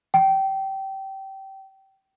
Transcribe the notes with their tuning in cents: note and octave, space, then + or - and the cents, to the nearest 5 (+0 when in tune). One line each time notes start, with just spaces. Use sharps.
G5 -20